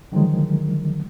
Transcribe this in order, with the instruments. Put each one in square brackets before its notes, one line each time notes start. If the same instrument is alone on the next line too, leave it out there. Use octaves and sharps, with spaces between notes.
[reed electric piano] D3 D#3 F3 F#3 G#3